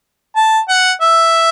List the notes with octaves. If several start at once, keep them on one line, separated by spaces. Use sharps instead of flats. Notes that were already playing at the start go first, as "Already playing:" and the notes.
A5
F#5
E5